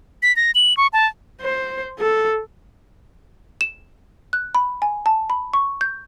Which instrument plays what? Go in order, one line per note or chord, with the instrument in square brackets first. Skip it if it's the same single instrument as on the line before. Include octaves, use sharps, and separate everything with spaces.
[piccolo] B6
A#6
F#7
C#6
A5
[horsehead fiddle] C5
A4
[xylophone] E7
F#6
B5
G#5
A5
B5
C#6
G6